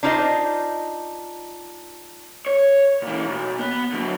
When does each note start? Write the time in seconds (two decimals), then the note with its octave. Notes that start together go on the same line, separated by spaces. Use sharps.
0.03 D4 D#4 F4 C5 C#5 D#5
2.46 C#5
3.02 A#2 E3
3.27 B1
3.59 B3
3.93 D3 F#3